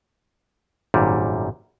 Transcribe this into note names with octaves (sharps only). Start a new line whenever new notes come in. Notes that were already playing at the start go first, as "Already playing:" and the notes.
G#1 F#2 A#2 G3